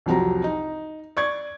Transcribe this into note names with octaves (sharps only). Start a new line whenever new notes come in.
C2 F2 F3 F#3 G4 A#5
D#4
D5 C#6 G#6